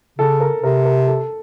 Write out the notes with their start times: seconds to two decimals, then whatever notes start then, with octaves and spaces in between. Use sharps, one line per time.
0.18 C#3 A4
0.40 A#4
0.62 C3 A#4
0.85 A#4
1.07 A4